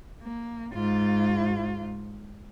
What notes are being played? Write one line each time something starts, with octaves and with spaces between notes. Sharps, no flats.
A#3
G#2 F4